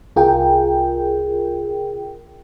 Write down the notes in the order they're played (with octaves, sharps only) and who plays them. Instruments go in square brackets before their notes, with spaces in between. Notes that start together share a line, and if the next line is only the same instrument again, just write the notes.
[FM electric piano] C2 F4 G#4 A#4 G5